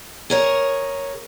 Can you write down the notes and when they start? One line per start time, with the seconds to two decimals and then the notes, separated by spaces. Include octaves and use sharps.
0.30 G#4 A#4 C#5